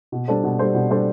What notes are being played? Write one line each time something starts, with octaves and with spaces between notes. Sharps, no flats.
B2
G3 D4 A4 C5
B2
G3 D4 A4 C5
B2
G3 D4 A4 C5